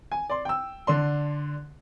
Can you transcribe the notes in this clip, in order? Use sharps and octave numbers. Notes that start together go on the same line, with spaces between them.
G#5
D5 C6
G5 E6
D3 D4 C6